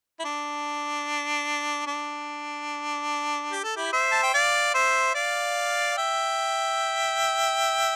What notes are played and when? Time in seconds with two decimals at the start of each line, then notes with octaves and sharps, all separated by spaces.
0.19 E4
0.25 D4
1.87 D4
3.51 G4
3.64 A4
3.76 E4 G4
3.92 C5 E5
4.12 A5
4.23 G5
4.34 D5 F5
4.74 C5 E5
5.15 D5 F5
5.97 E5 G5